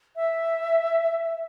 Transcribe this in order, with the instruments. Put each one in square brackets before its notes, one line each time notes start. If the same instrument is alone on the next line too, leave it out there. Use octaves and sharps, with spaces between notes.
[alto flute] E5